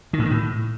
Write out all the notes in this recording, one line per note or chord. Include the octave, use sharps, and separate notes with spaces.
D#3
A2
D#3
A2